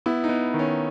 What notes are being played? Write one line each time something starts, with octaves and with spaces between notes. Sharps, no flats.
B3 E4
D#4
B3
D#3
C#4